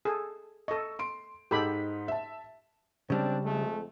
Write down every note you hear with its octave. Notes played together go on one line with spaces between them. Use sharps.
G#4 A4
A4 D#5 C#6 E6
C6 D7
G#2 D#4 G4 A4 B5 B6
E5 A5
C#3 G3 G#3 C4 D4
F2 G#3 A3